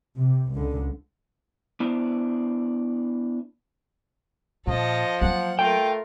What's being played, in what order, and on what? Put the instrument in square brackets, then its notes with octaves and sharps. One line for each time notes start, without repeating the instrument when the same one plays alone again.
[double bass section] C3
C#2 D3
[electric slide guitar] B3 D4 E4 C5
[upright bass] A#2 [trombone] F3 [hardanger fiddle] A4 D#5
[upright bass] F#3 A#3 [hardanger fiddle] F#5
[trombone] A3 [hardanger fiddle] F4 A#4 [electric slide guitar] G5